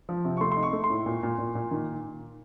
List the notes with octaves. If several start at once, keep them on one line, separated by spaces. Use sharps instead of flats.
F3
C3
C#6
A3 C6
D#4 C6
C#6
A3
C6
A2
A#2
A#2
A#2
A#2
D#3